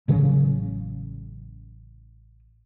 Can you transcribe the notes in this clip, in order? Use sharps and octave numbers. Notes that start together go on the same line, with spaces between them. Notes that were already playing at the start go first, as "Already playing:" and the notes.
A1 C#3 F#3